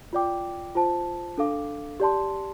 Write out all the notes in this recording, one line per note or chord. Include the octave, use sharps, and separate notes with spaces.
F4 D5 G5 D6
F4 C5 A5
D4 A4 F5 D6
G4 D5 A5 C6